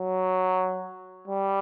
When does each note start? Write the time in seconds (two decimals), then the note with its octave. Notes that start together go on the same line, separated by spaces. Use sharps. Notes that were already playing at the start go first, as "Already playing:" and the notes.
Already playing: F#3
1.27 G3